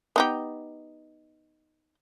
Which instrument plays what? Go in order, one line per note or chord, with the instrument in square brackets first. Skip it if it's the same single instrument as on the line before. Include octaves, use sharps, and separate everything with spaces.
[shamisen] B3 D#4 G4